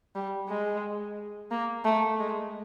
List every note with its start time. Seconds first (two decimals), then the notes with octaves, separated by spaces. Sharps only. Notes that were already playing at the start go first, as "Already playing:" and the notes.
0.15 G3
0.49 G#3
1.51 A#3
1.85 A3
2.19 G#3